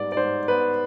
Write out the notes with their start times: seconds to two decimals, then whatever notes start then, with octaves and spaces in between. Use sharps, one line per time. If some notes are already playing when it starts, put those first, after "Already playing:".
Already playing: G#2 G3 B3 D5
0.12 D5
0.17 G#2 C5
0.48 B3 B4